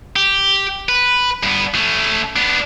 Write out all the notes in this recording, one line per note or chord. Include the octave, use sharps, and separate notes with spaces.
G4
B4
G2 B3
A3 C#4
B3 D4